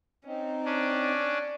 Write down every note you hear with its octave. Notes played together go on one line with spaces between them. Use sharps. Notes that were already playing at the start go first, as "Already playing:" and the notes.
C4 C#4 D#4
C#4 D4 D5